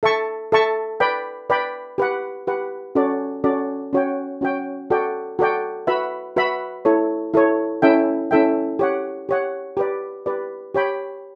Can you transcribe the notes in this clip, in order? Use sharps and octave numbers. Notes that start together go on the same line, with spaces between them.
A4 E5 A5 C#6
A4 E5 A5 C#6
B4 D5 G5 B5
B4 D5 G5 B5
G4 B4 F#5
G4 B4 F#5
C#4 F#4 A4 D5
C#4 F#4 A4 D5
C#4 F#4 C#5 G5
C#4 F#4 C#5 G5
F#4 A4 D5 G5
F#4 A4 D5 G5
F#4 B4 E5 B5
F#4 B4 E5 B5
E4 A4 C#5
E4 A4 C#5
C#4 E4 A4 E5 G5
C#4 E4 A4 E5 G5
G4 C#5 F#5
G4 C#5 F#5
G4 B4 D5
G4 B4 D5
G4 C#5 G5 B5